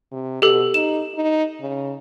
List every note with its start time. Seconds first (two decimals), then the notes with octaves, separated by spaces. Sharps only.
0.12 C3
0.42 B2 G4 A4
0.74 D#4 E7
1.15 D#4
1.61 C#3